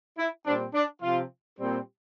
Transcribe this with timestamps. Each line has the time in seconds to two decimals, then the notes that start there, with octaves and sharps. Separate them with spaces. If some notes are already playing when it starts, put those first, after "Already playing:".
0.18 E4
0.46 A#2 G3 C4 D4
0.74 D4
1.02 C3 F3 C4 F4
1.59 A#2 G3 C4